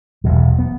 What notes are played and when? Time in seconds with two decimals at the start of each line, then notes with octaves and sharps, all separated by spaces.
0.24 E1 E2 B2 F#3
0.59 B3